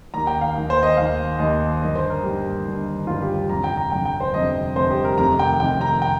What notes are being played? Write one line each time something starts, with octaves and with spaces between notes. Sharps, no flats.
D#2 D#3 A#5
G5
F5
D#2 D#3
C5
D#5
D#2 D#3 F5
D#2 D#3 D#5
G1 G2 D#3 D#5
C5
A#4
G1 G2 D#3 G4
G1 G2 D#3
G1 G2 D#3 F4
G4
G1 F2 C3 A#5
G5
A#5
G1 F2 C3 G5
G5
C5
G1 F2 C3 D#5
G1 F2 C3 C5
G4
A#4
F1 F2 C3 D#3 A#5
G5
F1 F2 C3 D#3 G5
A#5
G5